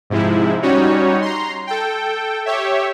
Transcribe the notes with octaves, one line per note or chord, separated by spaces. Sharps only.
G#2 C3 F3 G#3 E4
G3 C#4 D#4 F#4 C#5
A#5 C6
A4 G5
G4 C#5 E5